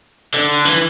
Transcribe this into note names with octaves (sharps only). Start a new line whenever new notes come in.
D3
E3